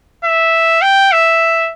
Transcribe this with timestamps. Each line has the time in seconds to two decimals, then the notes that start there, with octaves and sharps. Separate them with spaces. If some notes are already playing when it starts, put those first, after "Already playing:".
0.25 E5
0.82 G5
1.12 E5